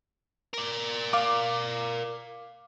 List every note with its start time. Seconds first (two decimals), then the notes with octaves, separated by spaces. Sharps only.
0.54 A#4 D5
1.13 F5 D6